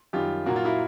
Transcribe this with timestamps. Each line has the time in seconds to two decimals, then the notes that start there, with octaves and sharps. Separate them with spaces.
0.13 F#2 D#3 G3 F4 G4
0.46 A#2 F#3 A#3 F#4
0.56 F4
0.65 E4 F#4